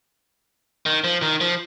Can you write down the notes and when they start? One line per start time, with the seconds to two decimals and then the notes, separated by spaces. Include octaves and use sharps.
0.86 D#3
1.04 F3
1.22 D#3
1.41 F3